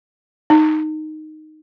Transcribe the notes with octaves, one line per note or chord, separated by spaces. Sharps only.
D#4